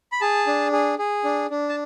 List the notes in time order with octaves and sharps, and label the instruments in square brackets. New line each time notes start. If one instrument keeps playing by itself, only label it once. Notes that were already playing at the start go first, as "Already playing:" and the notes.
[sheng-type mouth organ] B5
G#4 A5
D4
G#4
G#4
D4
D4
A5